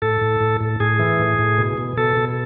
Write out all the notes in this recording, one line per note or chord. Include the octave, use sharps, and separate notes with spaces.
A2 A4
A2
A2
A2
A2 G#4
E3
A2
A2
B2
B2
B2 A4
B2